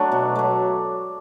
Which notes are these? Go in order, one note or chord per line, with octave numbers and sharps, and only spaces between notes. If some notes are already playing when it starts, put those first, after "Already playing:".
Already playing: F#3 A3 D4
B2
F#3 A3